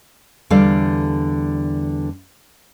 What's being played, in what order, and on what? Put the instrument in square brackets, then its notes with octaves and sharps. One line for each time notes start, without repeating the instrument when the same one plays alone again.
[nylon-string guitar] E2 D3 G3 A4 D5 F5